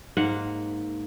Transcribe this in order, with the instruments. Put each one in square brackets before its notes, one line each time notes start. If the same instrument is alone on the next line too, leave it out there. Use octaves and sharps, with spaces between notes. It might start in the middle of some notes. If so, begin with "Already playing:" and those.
[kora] G#2 A#3 F#5